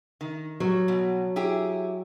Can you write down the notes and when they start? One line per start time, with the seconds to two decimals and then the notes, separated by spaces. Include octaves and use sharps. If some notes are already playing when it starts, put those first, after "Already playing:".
0.21 D#3
0.60 F#3 G3
0.88 B2
1.36 E4 G4 G#4